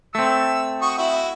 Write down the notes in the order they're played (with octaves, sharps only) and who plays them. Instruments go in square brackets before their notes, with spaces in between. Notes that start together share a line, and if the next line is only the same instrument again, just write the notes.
[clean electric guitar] A3 C4 [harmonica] E6
[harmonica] F#4 C#6 D#6
E4 F#4 E5